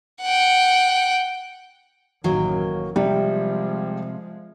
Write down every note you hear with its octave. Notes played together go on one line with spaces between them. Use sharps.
F#5 G5
A1 F#2 D#3 F#3 A#3
C3 F3 G3 G#3